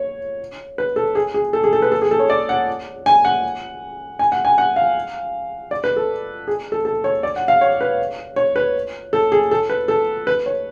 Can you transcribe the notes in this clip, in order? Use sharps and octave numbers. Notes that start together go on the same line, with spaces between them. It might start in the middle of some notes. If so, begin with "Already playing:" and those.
Already playing: C#5
B4
A4
G#4
G#4
A4
G#4
A4
B4
A4
G#4
A4
C#5
D5
F#5
G#5
F#5
G#5
F#5
G#5
F#5
F5
D5
B4
A4
G#4
A4
A4
C#5
D5
F#5
F5
C#5
B4
C#5
B4
A4
G#4
A4
B4
A4
B4
C#5